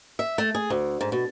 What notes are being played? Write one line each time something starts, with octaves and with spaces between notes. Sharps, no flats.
E5
A3
G#4
D2
G#2
B2